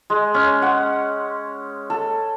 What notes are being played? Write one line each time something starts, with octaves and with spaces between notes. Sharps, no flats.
G#3
C#4
F#5
A4